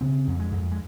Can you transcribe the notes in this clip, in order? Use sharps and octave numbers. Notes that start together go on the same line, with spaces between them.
C#3 C4
F2
G#3
F2
G#3